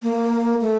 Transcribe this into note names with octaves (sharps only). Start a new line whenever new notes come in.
A#3
A3